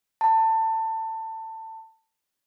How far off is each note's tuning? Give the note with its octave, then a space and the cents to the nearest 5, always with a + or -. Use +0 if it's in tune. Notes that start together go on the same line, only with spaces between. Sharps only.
A5 +20